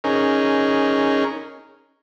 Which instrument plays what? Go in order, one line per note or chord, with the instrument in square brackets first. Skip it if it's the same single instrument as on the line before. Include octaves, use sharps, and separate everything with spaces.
[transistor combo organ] C#4 D#4 G#4 A#4